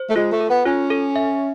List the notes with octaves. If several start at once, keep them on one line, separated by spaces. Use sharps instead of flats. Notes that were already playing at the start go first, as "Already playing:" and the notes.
Already playing: C5
A3
G#3 F4
A3
A4
B3
C#4 F4
A4
E5